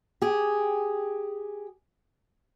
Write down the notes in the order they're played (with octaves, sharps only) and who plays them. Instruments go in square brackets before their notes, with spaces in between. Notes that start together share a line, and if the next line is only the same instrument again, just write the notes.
[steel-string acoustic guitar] G4 G#4